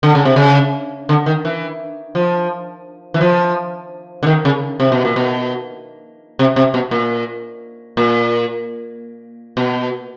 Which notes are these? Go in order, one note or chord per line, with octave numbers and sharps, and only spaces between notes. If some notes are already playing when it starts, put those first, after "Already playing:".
D3
C#3
C3
C#3
D3
D#3
E3
F3
E3
F3
D3
D#3
C#3
C3
B2
A#2
B2
C3
C3
B2
A#2
A#2
B2